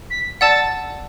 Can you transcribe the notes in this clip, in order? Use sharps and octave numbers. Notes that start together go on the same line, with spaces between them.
B6
D5 F#5 A5 E6 A6